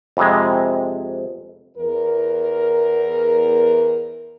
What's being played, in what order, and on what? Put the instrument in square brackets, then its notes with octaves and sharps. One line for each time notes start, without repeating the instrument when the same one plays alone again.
[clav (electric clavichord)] F2 C3 G#3
[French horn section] E2 A#4